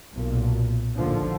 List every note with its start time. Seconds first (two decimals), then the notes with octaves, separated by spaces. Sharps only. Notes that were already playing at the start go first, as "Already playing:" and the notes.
0.13 B1 A#2
0.95 A1 D#2 D3 F3